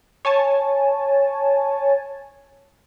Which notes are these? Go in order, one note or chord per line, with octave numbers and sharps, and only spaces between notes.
C#5 G#5 A5